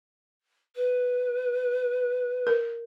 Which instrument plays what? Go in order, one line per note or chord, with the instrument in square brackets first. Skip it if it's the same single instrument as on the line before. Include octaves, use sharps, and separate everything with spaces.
[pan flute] B4
[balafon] A#4